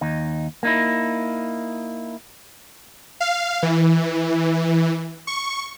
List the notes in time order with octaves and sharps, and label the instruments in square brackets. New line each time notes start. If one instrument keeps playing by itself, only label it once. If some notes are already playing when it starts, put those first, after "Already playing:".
[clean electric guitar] D#2 D#4
A#3 D#4 E4
[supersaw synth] F5
E3
C#6